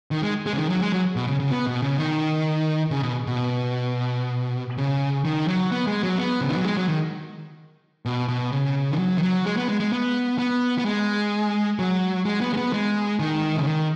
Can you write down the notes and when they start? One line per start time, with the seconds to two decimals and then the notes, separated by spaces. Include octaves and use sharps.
0.11 D#3
0.22 G#3
0.46 G#3
0.53 C#3
0.58 D#3
0.69 F#3
0.81 G#3
0.92 F#3
1.16 B2
1.27 C#3
1.40 C#3
1.50 B3
1.67 B2
1.82 C#3
1.98 D#3
2.91 C#3
3.03 B2
3.27 B2
4.78 C#3
5.25 D#3
5.48 F#3
5.72 B3
5.87 G#3
6.03 F#3
6.18 B3
6.41 C#3
6.49 D#3
6.57 F#3
6.65 G#3
6.77 F#3
6.88 D#3
8.06 B2
8.28 B2
8.52 C#3
8.91 D#3
8.98 F#3
9.18 D#3
9.22 F#3
9.46 G#3
9.57 B3
9.69 G#3
9.80 G#3
9.92 B3
10.39 B3
10.79 B3
10.85 G#3
11.79 F#3
12.25 G#3
12.41 B3
12.53 G#3
12.57 B3
12.73 G#3
13.19 D#3
13.57 C#3
13.66 D#3